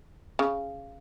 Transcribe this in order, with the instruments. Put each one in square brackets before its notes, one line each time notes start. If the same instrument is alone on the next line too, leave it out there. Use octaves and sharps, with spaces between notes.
[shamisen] C#3